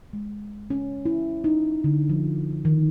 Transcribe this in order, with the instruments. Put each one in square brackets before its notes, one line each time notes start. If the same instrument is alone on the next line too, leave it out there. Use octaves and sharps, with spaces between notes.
[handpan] G#3
C#4
E4
D#4
D3
F3
D#3